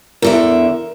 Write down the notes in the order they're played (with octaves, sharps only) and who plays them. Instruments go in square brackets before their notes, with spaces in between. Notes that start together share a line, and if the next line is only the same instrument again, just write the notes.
[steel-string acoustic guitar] E2 D3 E5 [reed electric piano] A#4